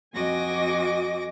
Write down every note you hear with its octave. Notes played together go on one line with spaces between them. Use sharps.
F2 F#4 D#5 G#5 D6 A#6